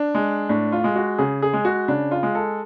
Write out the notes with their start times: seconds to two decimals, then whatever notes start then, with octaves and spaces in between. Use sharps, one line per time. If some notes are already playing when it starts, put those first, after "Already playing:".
Already playing: D4
0.15 G#3
0.49 A2 D4
0.72 F4
0.84 G#3
0.96 F#4
1.18 C#3 G#4
1.42 G#4
1.53 G#3
1.65 F#4
1.88 C#3 D4
2.11 F4
2.23 G#3
2.35 A4